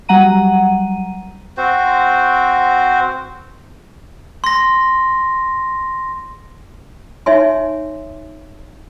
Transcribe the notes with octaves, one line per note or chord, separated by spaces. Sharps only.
F#3 G3 F#5 A#5 D#7
C4 F#4 C5
C6 A#6
D#4 C#5 E5 G#5 C6